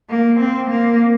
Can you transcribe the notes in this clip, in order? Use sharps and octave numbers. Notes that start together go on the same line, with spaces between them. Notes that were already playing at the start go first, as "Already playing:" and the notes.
A#3
C4
A#3